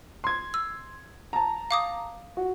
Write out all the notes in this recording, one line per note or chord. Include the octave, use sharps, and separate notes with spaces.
C6 G#6
E6
A5 A#5
F5 D6 D#6
F#4